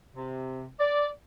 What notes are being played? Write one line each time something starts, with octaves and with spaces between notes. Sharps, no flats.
C3
D5